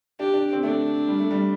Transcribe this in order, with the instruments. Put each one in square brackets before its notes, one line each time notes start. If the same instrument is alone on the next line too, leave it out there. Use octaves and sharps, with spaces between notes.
[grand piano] D4 [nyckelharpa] G4
[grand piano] D4
C4
[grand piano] A3 [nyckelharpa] D4
[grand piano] G3
A3
G3